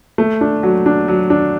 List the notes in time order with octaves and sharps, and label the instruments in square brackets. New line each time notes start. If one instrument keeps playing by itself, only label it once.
[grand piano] A3
D4
F#3
D4
F#3
D4